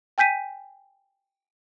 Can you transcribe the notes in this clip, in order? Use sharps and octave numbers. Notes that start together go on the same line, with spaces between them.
G5 G#5 G6 B6 D#7